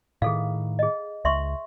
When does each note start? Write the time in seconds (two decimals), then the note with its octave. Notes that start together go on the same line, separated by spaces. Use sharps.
0.22 A2 D#3 G#4 A4 F5
0.79 G#4 D#5
1.25 C#2 E5 C6 C#6